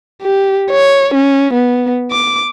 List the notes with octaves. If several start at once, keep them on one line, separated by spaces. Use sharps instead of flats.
G4
C#5
C#4
B3
D6